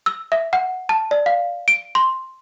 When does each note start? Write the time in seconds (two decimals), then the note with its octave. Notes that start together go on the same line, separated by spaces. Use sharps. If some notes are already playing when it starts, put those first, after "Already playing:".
0.06 E6
0.32 E5
0.53 F#5
0.89 A5
1.11 D5
1.26 F5
1.68 D7
1.95 C6